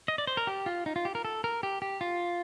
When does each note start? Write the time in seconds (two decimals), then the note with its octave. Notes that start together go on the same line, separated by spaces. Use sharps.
0.08 D#5
0.18 D5
0.27 C5
0.37 A#4
0.47 G4
0.66 F4
0.86 D#4
0.96 F4
1.05 G4
1.15 A#4
1.25 A4
1.44 A#4
1.63 G4
1.82 G4
2.01 F4